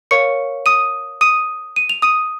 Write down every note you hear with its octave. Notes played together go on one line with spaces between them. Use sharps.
A#4 C#5 F5 C#6 C#7
D#6 D#7
D#6 D#7
D#7
F7
D#6 D#7